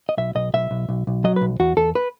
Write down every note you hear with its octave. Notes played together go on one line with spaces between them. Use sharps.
D#5
B1 E5
B1 D#5
B1 E5
B1
B1
B1
F#3 D#5
B4
B1
E2 F#4
E2 A4
B4